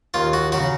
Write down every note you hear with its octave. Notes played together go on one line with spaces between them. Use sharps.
D#2 F4
F#4
C#3 F#3 F#4